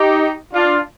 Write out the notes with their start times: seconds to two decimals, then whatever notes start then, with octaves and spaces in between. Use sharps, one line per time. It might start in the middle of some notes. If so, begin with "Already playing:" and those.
Already playing: D#4 G4
0.54 D4 F4